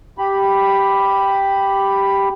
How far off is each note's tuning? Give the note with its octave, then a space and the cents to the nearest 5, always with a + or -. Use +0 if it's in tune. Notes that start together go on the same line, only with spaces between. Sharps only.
G4 +0 B5 +0